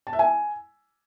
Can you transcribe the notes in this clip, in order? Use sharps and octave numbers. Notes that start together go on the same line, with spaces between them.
A5
E5
G#5